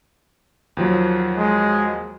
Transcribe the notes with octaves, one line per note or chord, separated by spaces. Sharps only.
D#2 F3 F#3
G#3